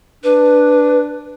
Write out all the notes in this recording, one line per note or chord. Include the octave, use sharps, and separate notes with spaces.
D4 B4